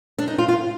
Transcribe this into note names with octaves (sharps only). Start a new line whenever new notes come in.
D4
D#4
F4
F4